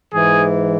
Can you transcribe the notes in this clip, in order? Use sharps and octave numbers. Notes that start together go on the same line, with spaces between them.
G#2 E3 G#4